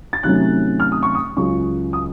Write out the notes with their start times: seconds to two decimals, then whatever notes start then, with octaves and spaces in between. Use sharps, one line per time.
0.13 A6
0.23 C3 D#3 F#3 A3 C#4 F#6
0.80 F6
0.92 D#6
1.03 C#6
1.15 D#6
1.36 C#2 C#3 F#3 C#6
1.93 D#6